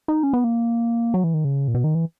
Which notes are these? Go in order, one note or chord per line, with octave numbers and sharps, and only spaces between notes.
D#4
C#4
B3
A#3
F#3
E3
D#3
C#3
A#2
B2
D#3
E3